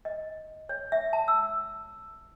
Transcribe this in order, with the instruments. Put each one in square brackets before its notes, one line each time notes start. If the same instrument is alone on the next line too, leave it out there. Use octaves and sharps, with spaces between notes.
[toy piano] D#5
C#5
E5
A5
E6